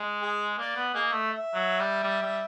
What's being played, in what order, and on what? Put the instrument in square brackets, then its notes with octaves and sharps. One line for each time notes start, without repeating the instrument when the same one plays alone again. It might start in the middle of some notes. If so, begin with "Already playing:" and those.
Already playing: [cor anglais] G#3
[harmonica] G#4
[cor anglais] A#3 [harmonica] D5
[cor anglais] B3
[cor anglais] A#3 [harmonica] G#4 D#5
[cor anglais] A3
[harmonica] E5
[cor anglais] F#3
G3
G3
G3